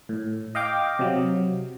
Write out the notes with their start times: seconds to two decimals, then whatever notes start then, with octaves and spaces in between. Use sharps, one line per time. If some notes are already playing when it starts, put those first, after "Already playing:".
0.09 A2
0.55 D#5 F5 G5 D6
0.99 C3 F#3